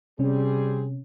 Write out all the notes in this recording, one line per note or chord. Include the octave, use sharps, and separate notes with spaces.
C3 G3 C4 C#4 G#4